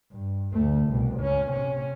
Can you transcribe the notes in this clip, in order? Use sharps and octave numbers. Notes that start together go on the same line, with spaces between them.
G2
D2 A3
C2 B2
C#2 C#4
C3 C#4